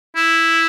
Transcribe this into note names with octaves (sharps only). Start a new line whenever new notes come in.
E4